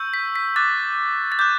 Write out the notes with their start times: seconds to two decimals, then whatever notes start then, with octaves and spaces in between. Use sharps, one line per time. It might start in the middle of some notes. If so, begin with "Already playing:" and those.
Already playing: C#6 E6 G6
0.14 B6
0.36 B6
0.56 D6 F#6 A6
1.32 A6
1.39 D6 F#6 G6